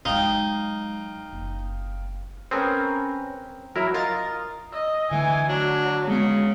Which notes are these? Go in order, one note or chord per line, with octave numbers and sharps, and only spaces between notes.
F#3 G#3 D#4 F5 G5
F#1
C4 C#4 G#4 A#4 B4
F#3 E4 A#4
F4 A#4 D#5 A6
D#5 E6
D3 E3 A3 G#5
F#3 D4
C#3 G#3 B3